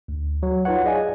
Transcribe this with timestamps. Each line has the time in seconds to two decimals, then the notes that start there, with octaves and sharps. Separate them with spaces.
0.08 D2
0.43 F#3
0.65 D#4 F4 B4 C#5 F#5
0.84 G#4 D5 D#5 F5 G#5